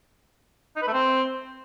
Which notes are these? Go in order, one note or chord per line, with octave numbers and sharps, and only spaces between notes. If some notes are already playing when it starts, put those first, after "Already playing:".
D#4
B4
A3
C4